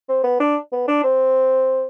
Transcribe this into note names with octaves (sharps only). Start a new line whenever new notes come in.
C4
B3
D4
B3
D4
C4